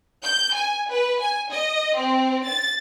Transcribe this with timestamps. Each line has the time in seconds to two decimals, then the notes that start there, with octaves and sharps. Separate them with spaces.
0.23 G6
0.55 G#5
0.90 B4
1.20 G#5
1.51 D#5
1.96 C4
2.47 A6